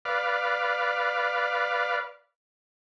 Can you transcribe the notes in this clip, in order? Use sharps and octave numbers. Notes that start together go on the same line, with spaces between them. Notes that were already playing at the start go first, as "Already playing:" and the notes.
B4 D5 F5